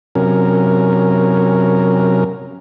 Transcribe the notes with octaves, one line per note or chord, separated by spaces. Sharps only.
C3 F#3 C#4 A#4